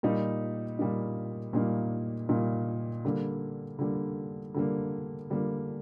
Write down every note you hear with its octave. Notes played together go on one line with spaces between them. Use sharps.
A#2 G3 A#3 D#4
A#2 G3 A#3 D#4
A#2 G3 A#3 D#4
A#2 G3 A#3 D#4
D3 G3 A#3
D3 G3 A#3
D3 G3 A#3
D3 G3 A#3